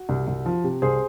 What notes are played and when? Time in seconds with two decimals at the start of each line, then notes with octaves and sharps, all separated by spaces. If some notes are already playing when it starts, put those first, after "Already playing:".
Already playing: F#4
0.09 C2
0.28 C2
0.46 F3
0.64 C3
0.82 C2 G#4 C5